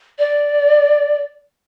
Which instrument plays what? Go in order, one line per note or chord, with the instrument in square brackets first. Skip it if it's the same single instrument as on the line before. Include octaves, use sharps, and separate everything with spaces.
[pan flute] D5